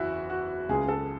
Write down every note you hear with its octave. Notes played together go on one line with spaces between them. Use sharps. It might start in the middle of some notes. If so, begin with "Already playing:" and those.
Already playing: F#1 E2 E4 F#4
F#4
C#2 C#3 G#3 G#4
A4